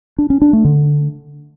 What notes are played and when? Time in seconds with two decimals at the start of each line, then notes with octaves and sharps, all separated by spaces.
0.18 D4
0.30 C#4
0.42 D4
0.53 A3
0.65 D3